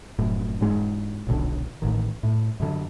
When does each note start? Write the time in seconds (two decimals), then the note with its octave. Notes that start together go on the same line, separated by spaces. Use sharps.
0.19 F1 F#2 A2
0.61 E1 G#2 G#3
1.27 D#1 B1 D3
1.82 A1 D#3
2.23 A2
2.60 F#2 D3